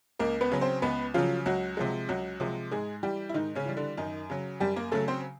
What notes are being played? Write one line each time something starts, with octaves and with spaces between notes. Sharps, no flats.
C#2 A#3 A#4
B3 B4
C#3 F#3
C4 C5
C#2 B3 B4
C#3 F3 F#3 F4
C#2 F#3 F#4
C3 F3 G#3
C#2 F#3 F#4
C3 F3 G#3
G#2 G#3 G#4
E3 G3 G4
E4
G#2 D#3 D#4
C#3 C#4
E3 G3
D3 D4
F#2 D#3 D#4
C#3 F#3
F#2 G3 G4
A#3 A#4
C#3 F#3 A3 A4
C4 C5